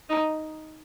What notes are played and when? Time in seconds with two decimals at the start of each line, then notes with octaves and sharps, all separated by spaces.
0.10 D#4